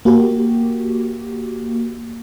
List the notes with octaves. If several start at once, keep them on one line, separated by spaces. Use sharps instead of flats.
A#3 F#4 G4